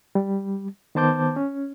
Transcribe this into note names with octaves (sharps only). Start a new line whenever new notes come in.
G3
D#3 B3 C5 A5 D6 G6
C#4